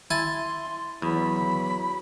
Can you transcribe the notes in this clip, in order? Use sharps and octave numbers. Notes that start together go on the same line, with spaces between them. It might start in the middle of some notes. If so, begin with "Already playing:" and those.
E4 G#5 A5 C6
E2 E3 F#3 B5